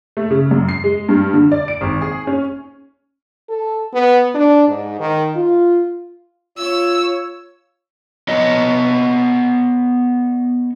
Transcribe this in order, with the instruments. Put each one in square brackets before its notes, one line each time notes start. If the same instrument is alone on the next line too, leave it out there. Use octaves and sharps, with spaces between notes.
[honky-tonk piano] A3
C#3
F#2
C7
G#3
G2
D3
D5
D7
G#1
G#4
C#4
[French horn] A4
B3
D4
G#2
D#3
F4
[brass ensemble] F4 C#5 [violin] E6
[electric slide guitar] B3 C#5 D#5